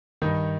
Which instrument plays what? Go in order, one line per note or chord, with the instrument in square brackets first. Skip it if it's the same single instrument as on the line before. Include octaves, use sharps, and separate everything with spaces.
[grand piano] G2 D#3 D#4